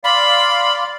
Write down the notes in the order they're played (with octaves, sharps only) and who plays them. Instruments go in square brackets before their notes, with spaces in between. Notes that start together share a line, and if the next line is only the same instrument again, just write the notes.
[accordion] D5 F5 C6 [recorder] B5